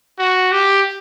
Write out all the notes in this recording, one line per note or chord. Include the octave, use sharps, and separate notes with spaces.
F#4
G4